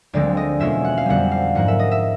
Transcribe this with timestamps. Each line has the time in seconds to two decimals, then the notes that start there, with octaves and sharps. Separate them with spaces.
0.13 D2 D3 F3 G#3 C4 D5
0.37 D#5
0.60 E2 B2 G#3 C#4 F4 E5
0.85 F#5
0.98 F5
1.06 F2 D3 G3 B3 F#5
1.32 F5
1.55 G#2 F3 A#3 F#5
1.68 E5
1.79 D#5
1.91 E5